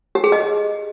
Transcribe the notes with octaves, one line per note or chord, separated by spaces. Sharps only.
G4
G#4
D#5